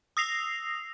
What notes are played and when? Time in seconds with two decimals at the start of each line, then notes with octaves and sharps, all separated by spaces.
0.17 D#6 E6 A#6 C7 F7